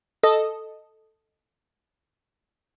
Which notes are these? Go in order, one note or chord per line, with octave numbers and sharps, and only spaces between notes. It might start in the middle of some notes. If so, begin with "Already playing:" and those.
A4 D#5